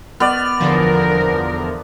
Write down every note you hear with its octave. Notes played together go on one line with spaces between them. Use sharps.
B3 D5 F6
E2 D3 F3 A#4